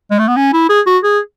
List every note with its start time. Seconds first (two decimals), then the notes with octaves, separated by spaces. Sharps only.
0.11 G#3
0.19 A3
0.28 B3
0.36 C#4
0.53 E4
0.69 G#4
0.86 F#4
1.04 G#4